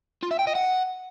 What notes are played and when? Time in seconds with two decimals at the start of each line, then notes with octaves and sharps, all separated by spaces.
0.23 F4
0.31 E5
0.39 G5
0.47 D#5
0.55 F#5